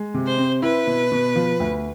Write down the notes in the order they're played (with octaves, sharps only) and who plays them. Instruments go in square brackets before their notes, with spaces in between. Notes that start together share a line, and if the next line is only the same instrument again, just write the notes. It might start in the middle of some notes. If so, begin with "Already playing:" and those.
Already playing: [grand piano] G#3
C3
[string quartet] C5
[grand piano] C4
[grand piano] E4 [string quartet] B4
[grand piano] B2
B2
F3
D2